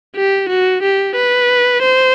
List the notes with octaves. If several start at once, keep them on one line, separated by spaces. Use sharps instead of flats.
G4
F#4
G4
B4
C5